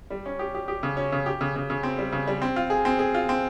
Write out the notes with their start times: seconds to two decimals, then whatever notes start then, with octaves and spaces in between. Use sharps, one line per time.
0.10 G3
0.26 C#4
0.39 G4
0.55 G4
0.68 G4
0.83 C#3
0.97 C#4
1.12 C#3
1.26 G4
1.41 C#3
1.56 C#3
1.70 C#3
1.83 C4
1.98 G3
2.12 C#3
2.27 G3
2.42 C4
2.56 F4
2.70 G#4
2.85 C4
2.99 G#4
3.15 F4
3.29 C4